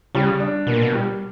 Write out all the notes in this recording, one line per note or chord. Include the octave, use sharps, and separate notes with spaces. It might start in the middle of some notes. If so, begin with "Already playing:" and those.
C#3 G3
D4
B2 A#3
A#2
B2
G3